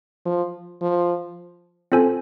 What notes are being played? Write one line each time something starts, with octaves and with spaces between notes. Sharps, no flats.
F3
F3
C4 F4 A4 C5 G#5